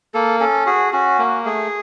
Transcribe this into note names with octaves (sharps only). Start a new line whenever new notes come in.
A#3 A4
C#4 A4
F#4 G#4
C#4 F#4
A#3
A3 G#4